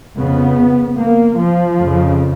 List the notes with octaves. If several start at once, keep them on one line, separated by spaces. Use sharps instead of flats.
F2 C#3 B3
A#3
F3
F2 C#3